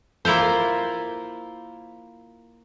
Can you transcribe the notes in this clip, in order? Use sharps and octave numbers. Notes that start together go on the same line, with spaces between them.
A#3 E4 F4 C5